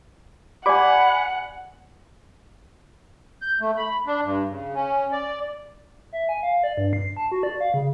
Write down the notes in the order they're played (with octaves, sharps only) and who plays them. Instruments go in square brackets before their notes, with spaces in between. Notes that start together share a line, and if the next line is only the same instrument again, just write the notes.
[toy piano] G4 D5 [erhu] F#5 [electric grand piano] G#5 B5 [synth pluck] D6
[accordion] G6
A3
B5
D4
G2
C#3
C#4
D5
[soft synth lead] E5
G#5
F5
D5
G2
C7
A5
F#4
D5
F5
C#3